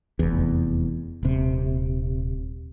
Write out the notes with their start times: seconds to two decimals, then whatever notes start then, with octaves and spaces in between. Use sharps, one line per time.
0.19 F1 E2
1.23 D#1 C3